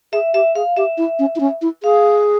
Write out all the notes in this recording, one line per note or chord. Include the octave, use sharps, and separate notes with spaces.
G#4 E5
G4 E5
G#4 F5
G4 E5
E4
C#4
E4
C#4
E4
G#4 F5